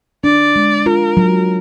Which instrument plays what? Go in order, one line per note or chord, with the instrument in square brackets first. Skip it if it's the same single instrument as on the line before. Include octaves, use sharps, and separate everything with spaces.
[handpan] D4 [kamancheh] D5
[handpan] G#3
[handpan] F4 [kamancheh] A#4
[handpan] F#3